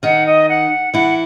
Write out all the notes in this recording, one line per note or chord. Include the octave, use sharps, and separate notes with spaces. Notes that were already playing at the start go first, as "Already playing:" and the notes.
D#3 D#4 F#5
D#5
F#5
E3 E4 F#5